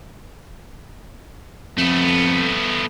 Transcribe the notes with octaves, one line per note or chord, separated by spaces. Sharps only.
F2 A3 B3